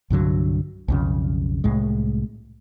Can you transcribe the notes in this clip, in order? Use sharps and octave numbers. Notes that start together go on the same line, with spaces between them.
C2 G2 D3 F#3
B1 F2 C#3
C2 A2 G#3